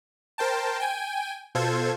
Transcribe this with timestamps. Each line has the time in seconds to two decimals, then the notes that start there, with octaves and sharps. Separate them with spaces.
0.38 A#4 C5 G5 A5
0.80 G5 G#5
1.55 B2 F4 A4 C5 G#6